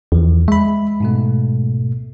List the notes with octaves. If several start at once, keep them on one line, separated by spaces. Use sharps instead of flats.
E2 E3 F3
G#3 E5 B5
G#2 B2 A3